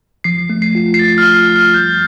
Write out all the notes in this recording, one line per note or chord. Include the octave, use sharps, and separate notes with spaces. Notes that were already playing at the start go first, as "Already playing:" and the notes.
F3 C7
A3
C7
F4
C7
F4 A6
F6
F4
F6
F3
F6
G3 G6